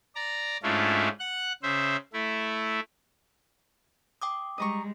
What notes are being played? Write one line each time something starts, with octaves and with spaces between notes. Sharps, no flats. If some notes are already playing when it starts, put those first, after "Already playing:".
D5 A#5
G#2 A3 C#4 D4 E4 F4
F#5 F#6
C#3 C5 E5
A3 E4
G5 D6 D#6
G3 G#3 D#5 A#5 C#6